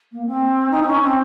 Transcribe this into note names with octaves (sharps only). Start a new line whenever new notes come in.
A#3
C4
D#4
C4
C#4
C4